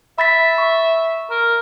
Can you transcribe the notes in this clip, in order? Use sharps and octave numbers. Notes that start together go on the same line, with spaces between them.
E5 B5 A6 B6
C#6
A#4